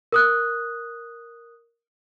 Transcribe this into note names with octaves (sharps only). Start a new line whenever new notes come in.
A#4 D#6 F#6